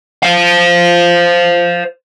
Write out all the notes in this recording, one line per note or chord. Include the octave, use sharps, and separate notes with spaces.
C5 F5